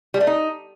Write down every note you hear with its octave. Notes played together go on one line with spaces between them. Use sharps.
G3
A3
D#4